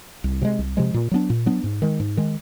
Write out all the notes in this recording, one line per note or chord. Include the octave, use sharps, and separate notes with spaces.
C2
C3 F3 G#3
C2
C3 F3 G#3
A#2
F#3 B3 D4
A#2
F#3 B3 D4
G#2
D#3 G#3
G#2
D#3 G#3